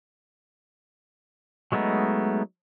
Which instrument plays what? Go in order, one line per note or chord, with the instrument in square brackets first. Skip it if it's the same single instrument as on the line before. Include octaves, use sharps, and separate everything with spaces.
[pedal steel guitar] F#3 G#3 A3 B3 D#4